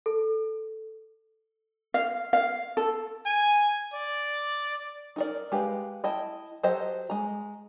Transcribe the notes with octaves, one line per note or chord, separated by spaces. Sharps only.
A4
F5
F5
A4
G#5
D5
D#4 A#4 D5
G#3 G4 B4 F5
E4 D#5 G5 A5
F#3 G4 A4 C5 D#5
G#3 A#5